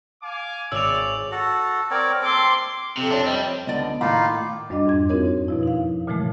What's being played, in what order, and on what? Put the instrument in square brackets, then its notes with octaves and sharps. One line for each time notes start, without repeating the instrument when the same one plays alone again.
[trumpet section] F5 G#5 D6
[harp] G#1 C#5 C#6 [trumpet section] D5 D6 [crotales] E6 F7
[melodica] F#4 A4
[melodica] C4 A#4 C#5 [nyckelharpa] D5
[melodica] C4 A4 [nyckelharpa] C6 D6
[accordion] F2 C4 [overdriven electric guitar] C3
[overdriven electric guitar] D4 [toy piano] C#5 E5 A5
[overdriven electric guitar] G3 [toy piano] D#5
[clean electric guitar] C#2 D3 [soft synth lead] B3 [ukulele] D5 D#5
[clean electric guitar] A2 D#3 A#3 [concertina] D#4 F4 [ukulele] B5 [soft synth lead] D6
[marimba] F#2 G3 D4 D#5 D6
F2 G#2 G#6
C4 D#4 F4 F#4 A#4 C#5
B2 F3 E4
D#4 F5
A#2 C#3 E3 F3 G#3 A3